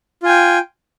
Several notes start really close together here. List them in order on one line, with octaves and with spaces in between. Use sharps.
F4 G#5 G5